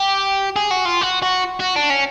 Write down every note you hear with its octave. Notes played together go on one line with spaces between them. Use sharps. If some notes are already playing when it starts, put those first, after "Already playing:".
Already playing: G4
G#4
F#4
F4
F#4
F#4
F#4
D4
C#4